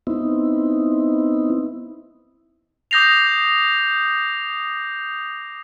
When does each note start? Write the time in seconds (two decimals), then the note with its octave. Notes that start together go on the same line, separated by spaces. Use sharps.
0.07 B3 C4 D#4 E4
2.91 D6 D#6 G6 A#6 C7 F7